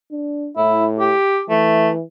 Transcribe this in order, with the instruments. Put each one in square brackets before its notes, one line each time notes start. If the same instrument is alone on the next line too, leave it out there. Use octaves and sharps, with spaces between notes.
[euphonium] D4
[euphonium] A2 [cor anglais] E4
[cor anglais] G4
[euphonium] E3 [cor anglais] A3